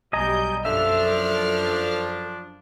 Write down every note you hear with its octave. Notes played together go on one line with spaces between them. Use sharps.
B1 G3 D#5 G#5 A#5 G6
F#2 F3 D4 A4 E5 F6